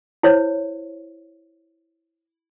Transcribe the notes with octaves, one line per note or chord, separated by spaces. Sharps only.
E4 C5 C#5